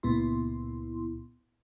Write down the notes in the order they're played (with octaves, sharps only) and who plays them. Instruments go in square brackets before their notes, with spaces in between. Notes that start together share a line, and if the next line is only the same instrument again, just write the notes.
[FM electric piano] C#2 A#2 B3 E4 C6